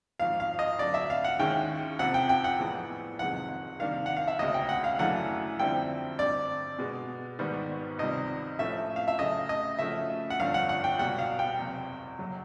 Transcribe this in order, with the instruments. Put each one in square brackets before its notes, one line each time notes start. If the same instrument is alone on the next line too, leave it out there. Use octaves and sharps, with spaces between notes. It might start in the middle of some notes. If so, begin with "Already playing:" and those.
[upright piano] G#1 G#2 F3 [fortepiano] F5
[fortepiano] F5
D#5
[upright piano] D2 D3 F#3 [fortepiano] D5
[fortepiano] E5
F5
F#5
[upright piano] D#2 D#3 G#3 C#4 E4 [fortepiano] G5
[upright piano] F2 C3 F3 [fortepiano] F#5
[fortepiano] G5
G5
F#5
[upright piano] A#1 A2 E3 G#3 B3
[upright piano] F#1 F2 C3 D#3 G#3 [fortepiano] F#5
[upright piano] C3 D#3 G3 A#3 D4 [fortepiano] F5
[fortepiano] F#5
F5
E5
[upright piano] E1 D2 C#3 [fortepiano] D#5
[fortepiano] G5
F#5
F5
[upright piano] F#2 C#3 E3 A3 D4 [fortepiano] F#5
[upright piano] F2 D3 G3 C4 E4 [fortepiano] G5
[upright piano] A1 G2 D3 G3 C4 [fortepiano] D5
[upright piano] B2 G#3 B3
G#1 G#2 D#3 G3 B3
[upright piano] C#2 C3 D#3 G3 [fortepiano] D#5
[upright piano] A2 F3 A3 C#4 [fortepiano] E5
[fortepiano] F5
E5
[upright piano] C#3 F#3 A3 C#4 [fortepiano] D#5
[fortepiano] D#5
[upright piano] C#3 F3 A3 C#4 F#4 [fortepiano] E5
[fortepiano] F#5
[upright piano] G1 G2 D3 F3 [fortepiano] F5
[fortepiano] F#5
F#5
G5
[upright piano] C#2 B2 G3 [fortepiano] F#5
[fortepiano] F5
G5
[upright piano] F#1 E2 C3
G1 F#2 C#3 F#3